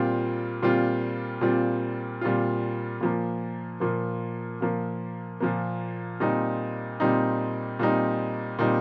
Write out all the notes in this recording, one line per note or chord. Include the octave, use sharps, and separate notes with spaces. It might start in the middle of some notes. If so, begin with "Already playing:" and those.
Already playing: A#2 G3 C4 F4
A#2 G3 C4 F4
A#2 G3 C4 F4
A#2 G3 C4 F4
A#2 F3 A#3
A#2 F3 A#3
A#2 F3 A#3
A#2 F3 A#3
A#2 G3 C4 D#4
A#2 G3 C4 D#4
A#2 G3 C4 D#4
A#2 G3 C4 D#4